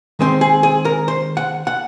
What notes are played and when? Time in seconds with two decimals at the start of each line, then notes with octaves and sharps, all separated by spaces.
0.19 D#3 G#3 C4 C5
0.41 G#4
0.63 G#4
0.85 A#4
1.08 C5
1.37 F#5
1.67 F#5